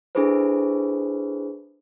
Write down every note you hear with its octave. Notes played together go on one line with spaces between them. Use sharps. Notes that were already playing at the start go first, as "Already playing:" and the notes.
D4 E4 G#4 A4 B4 C5